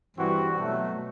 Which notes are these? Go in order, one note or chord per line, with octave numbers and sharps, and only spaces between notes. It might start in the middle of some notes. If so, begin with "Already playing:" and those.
G2 E3 G3 C4 F#4
B2 F#3 A3